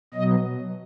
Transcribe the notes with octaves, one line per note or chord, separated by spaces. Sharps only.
B2 F#3 D#5